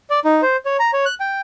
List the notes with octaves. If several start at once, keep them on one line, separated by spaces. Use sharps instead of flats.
D5
D#4
C5
C#5
A#5
C#5
F#6
G5